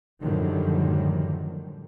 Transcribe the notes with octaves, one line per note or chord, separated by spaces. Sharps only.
F#2 A2 D3 D#3 F3 G3